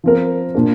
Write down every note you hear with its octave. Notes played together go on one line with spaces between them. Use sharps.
F3 C4 A#4
A#2 A#3 D4